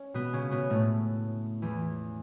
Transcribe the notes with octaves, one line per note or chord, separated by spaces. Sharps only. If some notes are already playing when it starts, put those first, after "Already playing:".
Already playing: C#4
B2 B3
C#3 C#4
B2 B3
A2 A3
E2 E3